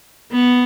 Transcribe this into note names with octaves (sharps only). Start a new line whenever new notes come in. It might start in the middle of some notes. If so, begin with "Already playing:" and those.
B3